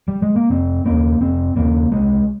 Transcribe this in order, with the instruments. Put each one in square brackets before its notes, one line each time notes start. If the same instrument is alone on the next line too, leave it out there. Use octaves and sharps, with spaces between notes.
[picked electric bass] G3
G#3
A#3
F1 C4
D#2 C#3 A#3
F1 C4
D#2 C#3 A#3
C2 G#3